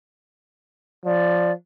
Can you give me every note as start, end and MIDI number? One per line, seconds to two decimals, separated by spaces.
1.05 1.52 53
1.05 1.52 74